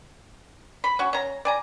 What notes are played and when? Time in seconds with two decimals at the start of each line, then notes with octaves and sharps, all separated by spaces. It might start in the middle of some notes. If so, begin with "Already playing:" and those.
0.84 B5
0.99 C#4 F#4
1.13 C#4 A#5
1.45 D5 G#5 A#5